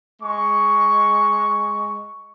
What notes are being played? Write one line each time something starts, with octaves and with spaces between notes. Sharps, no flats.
G#3 C#6